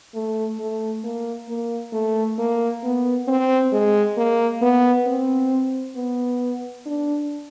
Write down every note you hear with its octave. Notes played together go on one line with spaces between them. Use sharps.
A3
A3
A#3
A#3
A3
A#3
B3
C4
G#3
A#3
B3
C4
B3
D4